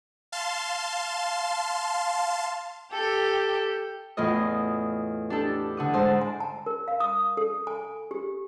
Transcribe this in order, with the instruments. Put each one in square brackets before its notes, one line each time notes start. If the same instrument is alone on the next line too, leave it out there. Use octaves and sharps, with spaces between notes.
[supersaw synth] F5 A5 C6
[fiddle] G4 A4
[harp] E2 A2 F4 D#5
D4 G4 A4
D3 F#5 D#6
G#2 C5 A5
[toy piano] G#5
A5
A#4
F5
D#6
A4
G#5
G4